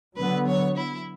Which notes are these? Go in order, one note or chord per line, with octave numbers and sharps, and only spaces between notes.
D3 F#3 B3 B4
C#5
E4